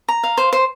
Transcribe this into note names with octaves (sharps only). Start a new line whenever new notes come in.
A#5
F5
C5
C5